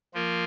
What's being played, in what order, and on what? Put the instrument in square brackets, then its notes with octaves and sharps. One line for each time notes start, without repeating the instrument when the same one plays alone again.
[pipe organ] F3 A#3 F4 A#4